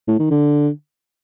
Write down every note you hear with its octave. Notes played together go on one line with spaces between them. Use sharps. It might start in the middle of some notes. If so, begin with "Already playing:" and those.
A2
D#3
D3